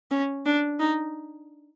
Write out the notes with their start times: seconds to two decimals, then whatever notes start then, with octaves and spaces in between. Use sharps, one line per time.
0.11 C#4
0.46 D4
0.80 D#4